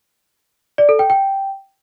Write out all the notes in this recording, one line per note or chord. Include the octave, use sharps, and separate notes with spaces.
D5
A4
G5
G5